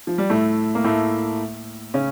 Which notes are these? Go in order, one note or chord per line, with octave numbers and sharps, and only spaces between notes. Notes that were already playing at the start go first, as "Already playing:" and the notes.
F3
G3
A2 A3
A#3
A2 A3
C#3 C#4